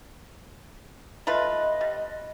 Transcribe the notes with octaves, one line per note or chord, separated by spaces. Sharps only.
A3 F4 B4 D#5
G3